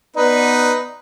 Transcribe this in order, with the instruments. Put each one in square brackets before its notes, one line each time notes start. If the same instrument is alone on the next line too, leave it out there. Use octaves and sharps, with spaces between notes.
[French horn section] B3 D5 [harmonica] D#4 B4